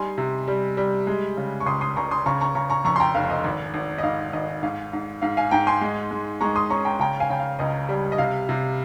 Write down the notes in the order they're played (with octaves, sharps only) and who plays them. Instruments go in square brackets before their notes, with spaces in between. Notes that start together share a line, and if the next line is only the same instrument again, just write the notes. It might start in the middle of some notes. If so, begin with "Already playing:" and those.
Already playing: [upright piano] G3 D#4 G#5 C6
C3
G3
G3
G#3
C#3
C#6
C#2 C6 D#6
C6 D#6
C#2 A#5 C#6
C6 D#6
C#3 A#5 C#6
A#5 C#6
C#3 A#5 C#6
A#5 C#6
F2 A#5 C#6
C6
G5 A#5
F1 F5
D#5
G#1
G#1
D#5
G#2 F5
G#1 D#5
G#2 F5
G#2
G#2 F5
F5 G#5
G#2 G5 A#5
G#5 C6
G#3
G#3
G#3 A#5 C#6
C6 D#6
C#4 A#5 C#6
G5 A#5
C#3 G5 A#5
F5 G#5
C#3 G5
F5
C#2 D#5
G3
D#5
C3 F5
C3